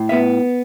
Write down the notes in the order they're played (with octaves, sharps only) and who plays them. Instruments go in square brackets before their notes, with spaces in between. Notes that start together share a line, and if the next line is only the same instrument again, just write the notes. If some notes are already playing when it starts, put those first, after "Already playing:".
Already playing: [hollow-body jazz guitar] A2
B3 E5